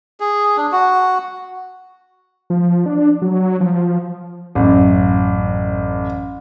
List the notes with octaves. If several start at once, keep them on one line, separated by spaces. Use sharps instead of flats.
G#4
D4
F#4
F3
D4
F#3
F3
A1 F#2